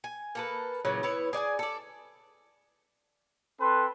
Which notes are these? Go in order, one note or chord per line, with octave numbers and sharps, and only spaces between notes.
G#5
A#3 A4 B4
A#2 C#3 E3 F#3
B3 E4 B4 C#5
G#4 D5 F#5 G#5
A4 D5
C4 A4 B4 C6